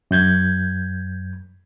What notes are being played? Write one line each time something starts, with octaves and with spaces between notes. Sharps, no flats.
F#2 G6 G#6